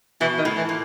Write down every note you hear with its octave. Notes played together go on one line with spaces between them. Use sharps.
B2 E3
D#3
A2
E3
A#2